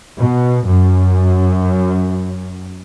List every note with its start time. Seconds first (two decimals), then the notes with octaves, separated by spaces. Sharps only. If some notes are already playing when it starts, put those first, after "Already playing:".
0.20 B2
0.66 F#2